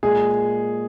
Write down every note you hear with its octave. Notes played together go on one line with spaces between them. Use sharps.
A#2 G#3 G#4